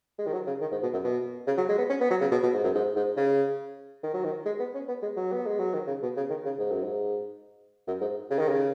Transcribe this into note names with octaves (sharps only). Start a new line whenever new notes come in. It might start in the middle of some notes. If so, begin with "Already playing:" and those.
G#3
D#3
F#3
C#3
D#3
G#2
B2
F#2
B2
C#3
F#3
G#3
B3
C#4
B3
F#3
C#3
B2
B2
G#2
F#2
G#2
G#2
C#3
D#3
F#3
D#3
G#3
B3
C#4
B3
G#3
F#3
B3
G#3
F#3
D#3
C#3
B2
C#3
D#3
C#3
G#2
F#2
G#2
F#2
G#2
C#3
D#3
C#3